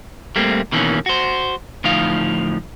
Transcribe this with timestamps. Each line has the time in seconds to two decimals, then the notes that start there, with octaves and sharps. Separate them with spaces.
0.36 G3 A3 A#3 C4
0.72 B2 D#3 E3 G#3 A#3 C#4
1.06 F#4 C5
1.84 D2 A2 F3 D#4 F5